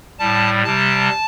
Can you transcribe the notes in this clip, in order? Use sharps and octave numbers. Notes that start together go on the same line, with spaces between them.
A2 G3 A5
C3 G3 A5